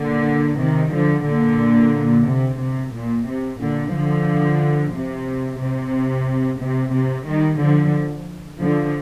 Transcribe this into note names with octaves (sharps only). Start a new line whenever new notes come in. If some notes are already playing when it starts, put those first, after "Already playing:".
Already playing: A#2 D3
C3 D#3
D3 F3
A#2 D3
C3
C3
A#2
C3
A#2 D3
D3 F3
C3
C3
C3
C3
D#3 G3
D3 F3
D3 F3